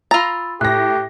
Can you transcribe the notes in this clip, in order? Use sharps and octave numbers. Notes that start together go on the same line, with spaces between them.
F4 A#5 B5 E6 A6
A2 G4 F#6 A#6